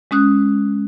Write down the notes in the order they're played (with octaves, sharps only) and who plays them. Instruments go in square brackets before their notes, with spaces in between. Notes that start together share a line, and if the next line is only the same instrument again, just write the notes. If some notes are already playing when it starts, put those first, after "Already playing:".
[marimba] G#3 C#4 D#6 F#6